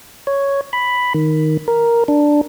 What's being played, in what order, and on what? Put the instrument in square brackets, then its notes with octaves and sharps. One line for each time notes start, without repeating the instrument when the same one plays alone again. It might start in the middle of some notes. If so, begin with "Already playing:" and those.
[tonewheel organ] C#5
B5
D#3
A#4
D4